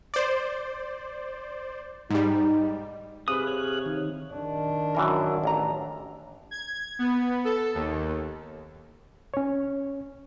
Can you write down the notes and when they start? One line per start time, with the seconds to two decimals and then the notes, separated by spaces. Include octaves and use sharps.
0.14 C5 D5
2.10 G#2 G3 D#4
3.28 C3 G#4 B4 F5 D#6 F#6
3.47 C#5
3.86 D#3
4.34 D#3 D4
4.95 F#2 E3 A#4
5.44 A1 A#5
6.51 G#6
6.99 B3
7.45 A4
7.75 D#2
9.34 C#4 C#5